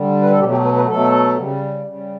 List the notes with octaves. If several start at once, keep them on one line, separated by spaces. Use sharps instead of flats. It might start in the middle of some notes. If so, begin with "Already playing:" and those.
Already playing: D3 G3
B4
A4
B2 F#3 A3 G4
G4
B4
B4
B2 F#3 A3 A4
C#3 G3
C#3 G3